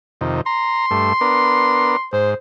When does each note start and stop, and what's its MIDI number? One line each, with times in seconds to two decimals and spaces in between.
0.21 0.41 41
0.21 0.41 48
0.21 0.41 51
0.46 0.86 82
0.46 2.07 84
0.91 1.13 43
0.91 1.13 57
1.21 1.97 59
1.21 1.97 62
1.21 1.97 70
2.13 2.35 44
2.13 2.34 72